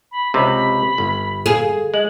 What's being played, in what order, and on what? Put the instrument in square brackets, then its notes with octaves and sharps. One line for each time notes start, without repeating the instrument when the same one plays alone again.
[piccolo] B5
[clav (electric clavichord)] C#2 C3 [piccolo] B5
[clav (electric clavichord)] G1
[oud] G#4
[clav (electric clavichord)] G#3 [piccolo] F#7